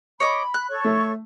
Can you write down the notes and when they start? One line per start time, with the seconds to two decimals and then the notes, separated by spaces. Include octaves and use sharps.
0.20 C#5 D#5 B5 D6
0.54 F#6
0.69 A4 C#5 C#6
0.84 A3